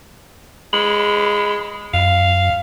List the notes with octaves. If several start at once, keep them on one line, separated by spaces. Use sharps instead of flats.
G#3 B5
F#2 F5